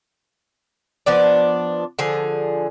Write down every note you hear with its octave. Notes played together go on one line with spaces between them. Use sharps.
F3 B3 D4 D5
D3 F3 G#4